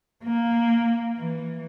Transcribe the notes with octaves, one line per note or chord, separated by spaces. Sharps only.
A#3
E3